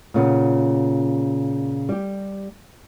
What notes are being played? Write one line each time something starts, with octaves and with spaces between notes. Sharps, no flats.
A#2 C#3 B3
G3 G4